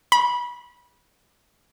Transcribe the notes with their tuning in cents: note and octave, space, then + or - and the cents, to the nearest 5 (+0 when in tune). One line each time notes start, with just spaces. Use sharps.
B5 -25